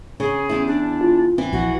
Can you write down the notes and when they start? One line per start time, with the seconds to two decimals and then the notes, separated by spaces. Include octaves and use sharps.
0.20 C#3 C#4 G#4
0.49 E2 E4
0.67 D4
1.01 F4
1.38 E3 C4
1.53 A#1 F#4